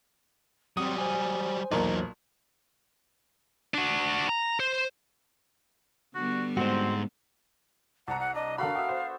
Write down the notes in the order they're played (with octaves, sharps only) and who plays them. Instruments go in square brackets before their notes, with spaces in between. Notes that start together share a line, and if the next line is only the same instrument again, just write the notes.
[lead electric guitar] F#3 G3 [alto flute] C4 [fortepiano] D#6
[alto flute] C5 [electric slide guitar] G#5
[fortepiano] B1 A#2 A#4 [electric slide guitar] E2 [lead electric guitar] F#3 D#4
[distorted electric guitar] D4 F#4
A#5
C5
[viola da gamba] D3 G3 B3 [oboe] F#4
[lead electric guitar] G#2 G#3 [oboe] C4 [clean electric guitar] F#4 C5
[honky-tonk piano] C2 A#5 [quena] F#5 [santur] A5
[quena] F#5
[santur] D4 [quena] D#5
[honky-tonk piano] D3 F#5 B5 [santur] F#4 A4 A#4 [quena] F5
[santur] B3 F#4 E5 [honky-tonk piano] G5
[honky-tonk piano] C5